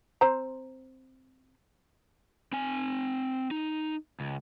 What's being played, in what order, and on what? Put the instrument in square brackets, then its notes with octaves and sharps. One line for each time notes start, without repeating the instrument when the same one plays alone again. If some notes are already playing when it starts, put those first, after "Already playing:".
[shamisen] C4 C5 A#5
[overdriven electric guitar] C4 G#5
D#4
C#2